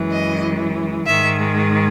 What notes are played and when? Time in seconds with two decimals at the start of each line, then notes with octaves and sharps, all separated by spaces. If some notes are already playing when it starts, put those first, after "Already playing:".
Already playing: F#2 E3 G#3
0.11 D#5
1.05 G#2 D#3 G#3 E5